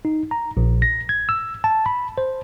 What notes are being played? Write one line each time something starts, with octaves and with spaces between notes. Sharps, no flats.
D#4
A#5
A#1
A#6
G#6
E6
A5
B5
C5